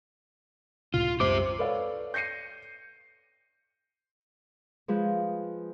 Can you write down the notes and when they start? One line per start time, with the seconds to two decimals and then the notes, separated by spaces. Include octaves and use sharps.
0.94 C#2 A2 C3 F4
1.20 C2 F#2 G#3 G4 C5 D6
1.59 A4 B4 C#5 D5 F5
2.14 G6 A#6 C7 C#7 D#7
4.88 F3 G#3 G#4 B4 C5